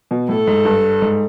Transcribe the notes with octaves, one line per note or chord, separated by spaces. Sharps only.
B2
A2 A4
G#2
G2
G#2